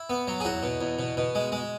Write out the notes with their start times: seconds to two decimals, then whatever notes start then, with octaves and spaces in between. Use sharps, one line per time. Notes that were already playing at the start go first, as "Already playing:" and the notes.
Already playing: E4
0.10 B3
0.27 F#3
0.40 G#4
0.45 E2 F#4
0.63 B2
0.81 E2
0.99 B2
1.17 B2
1.35 G#3
1.52 G#3